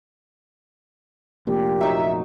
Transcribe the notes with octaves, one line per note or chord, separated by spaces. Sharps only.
F1 A#1 A#2 G4
F#3 D#4 E5